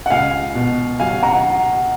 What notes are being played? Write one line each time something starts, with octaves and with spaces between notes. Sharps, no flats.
F#5
C#2 F5 G#5
B2
F#3 F5 G#5
F#5 A#5